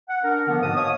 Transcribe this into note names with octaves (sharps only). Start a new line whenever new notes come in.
F#5
D4 A#4
D3 D#3 F3 A#3 B3
G#2 B2 B4 A5 D#6
C#5 D#5 F5 D#6